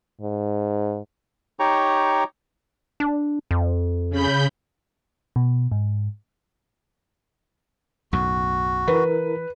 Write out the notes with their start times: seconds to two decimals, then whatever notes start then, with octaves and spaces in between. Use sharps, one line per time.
0.21 G#2
1.60 D#4 G4 C#5 G5 A#5 C#6
3.00 D4
3.51 F2
4.10 C#3 B5 G6
5.36 B2
5.72 G#2
8.13 B1 F#2 A2 F#4
8.88 E3 E4 A#4 B4